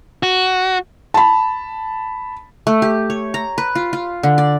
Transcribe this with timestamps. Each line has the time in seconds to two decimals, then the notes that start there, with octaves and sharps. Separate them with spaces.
0.23 F#4
1.14 A5 B5
2.67 A3
2.82 G4
3.10 C#5
3.34 A#5
3.58 B4
3.75 F4
3.93 F4
4.23 D3
4.38 D5